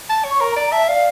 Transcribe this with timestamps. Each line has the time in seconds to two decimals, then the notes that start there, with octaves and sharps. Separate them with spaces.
0.10 A5
0.24 C#5
0.31 C#6
0.41 A#4 A#5
0.56 D5 A#5
0.72 E5 A5
0.88 D5 F5